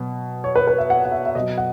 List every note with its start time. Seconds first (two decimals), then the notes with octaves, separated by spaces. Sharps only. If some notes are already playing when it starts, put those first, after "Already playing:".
Already playing: B2 F#3
0.44 C#5
0.56 B4
0.67 B4
0.78 E5
0.90 F#5
1.05 F#5
1.12 E5
1.26 E5
1.35 B2 F#3 D#5
1.58 F#5